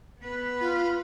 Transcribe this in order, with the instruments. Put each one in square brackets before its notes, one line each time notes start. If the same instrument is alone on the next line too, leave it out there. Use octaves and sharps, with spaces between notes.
[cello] B3 B4
[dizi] F4